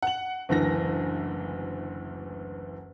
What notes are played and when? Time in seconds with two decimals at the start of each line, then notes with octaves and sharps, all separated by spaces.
0.03 F#5 F#7
0.49 F#1 D2 E3 A#6